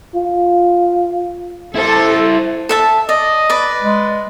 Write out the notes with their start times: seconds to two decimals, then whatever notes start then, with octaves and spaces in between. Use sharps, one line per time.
0.15 F4
1.76 E4 A4 C5
2.69 A4 E5 A5
3.09 D5 D#5
3.50 B4 D5
3.83 G#3